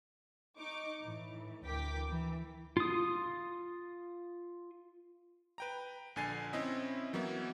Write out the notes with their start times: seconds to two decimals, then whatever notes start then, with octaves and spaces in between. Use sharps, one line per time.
0.57 D#4 C#6 D6
1.01 A2 E3
1.65 D2 E3 A#4 G5 D6 B6
2.10 E3
2.77 F4 D#6
5.58 B4 G5 A#5
6.16 A#1 D3 G#5 A6 C7
6.53 C4 C#4 E4 D#5 E5
7.13 E3 F#3 A#3 B3 E4